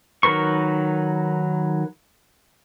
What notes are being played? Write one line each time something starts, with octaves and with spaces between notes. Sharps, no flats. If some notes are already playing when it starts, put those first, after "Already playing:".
D#3 F#3 A#4 B4 C#6